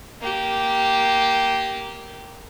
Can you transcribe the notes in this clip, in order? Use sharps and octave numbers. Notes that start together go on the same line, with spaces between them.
A#3 G4